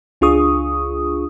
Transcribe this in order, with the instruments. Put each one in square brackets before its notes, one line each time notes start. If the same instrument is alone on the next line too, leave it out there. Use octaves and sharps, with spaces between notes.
[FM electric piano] C#2 D4 F4 G#4 C#6 D#6